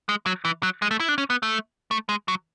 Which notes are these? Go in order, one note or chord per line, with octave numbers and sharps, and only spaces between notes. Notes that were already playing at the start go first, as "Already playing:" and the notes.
G#3
F#3
E3
F#3
G#3
A3
E4
D4
C#4
B3
A3
A3
G#3
F#3